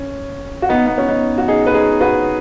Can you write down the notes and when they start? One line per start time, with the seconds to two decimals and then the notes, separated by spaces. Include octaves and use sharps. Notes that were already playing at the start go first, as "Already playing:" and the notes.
Already playing: C#4
0.62 F#4
0.69 B3 D#4
0.86 B3
0.98 C#4
1.09 B3 D#4
1.38 F#4
1.48 D#4 G#4
1.66 B4
1.74 D#4 G#4
2.01 F#4 B4